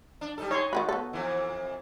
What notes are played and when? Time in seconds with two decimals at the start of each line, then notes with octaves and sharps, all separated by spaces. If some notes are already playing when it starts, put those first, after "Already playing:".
0.21 D4
0.38 G3 D#4 A4
0.51 D#4 C#5 C6
0.73 D#3 E3 F#4 B5
0.89 B3 A4
1.13 F2 E3